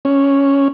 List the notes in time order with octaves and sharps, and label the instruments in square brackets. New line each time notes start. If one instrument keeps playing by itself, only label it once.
[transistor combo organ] C#4